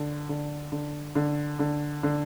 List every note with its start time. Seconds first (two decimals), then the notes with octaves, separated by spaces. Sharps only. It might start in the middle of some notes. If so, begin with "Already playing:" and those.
Already playing: D3
0.29 D3
0.72 D3
1.15 D3
1.59 D3
2.03 D3